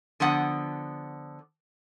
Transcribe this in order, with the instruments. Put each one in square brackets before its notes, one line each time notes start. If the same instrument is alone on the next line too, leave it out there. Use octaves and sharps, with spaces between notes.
[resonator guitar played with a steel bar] D3 F3 B3 F#5